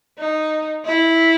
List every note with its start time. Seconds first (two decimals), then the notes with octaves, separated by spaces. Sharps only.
0.18 D#4
0.85 E4